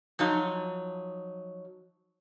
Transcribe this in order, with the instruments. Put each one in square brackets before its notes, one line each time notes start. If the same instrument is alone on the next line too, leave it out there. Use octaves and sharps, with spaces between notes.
[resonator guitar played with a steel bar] F3 F#3 D#4